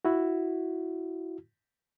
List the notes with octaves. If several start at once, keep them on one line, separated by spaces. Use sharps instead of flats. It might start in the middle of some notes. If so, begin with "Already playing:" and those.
E4 F#4